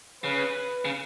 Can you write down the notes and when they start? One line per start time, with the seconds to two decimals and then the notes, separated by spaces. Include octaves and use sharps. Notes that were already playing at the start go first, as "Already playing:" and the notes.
0.24 C#3 B4
0.85 C#3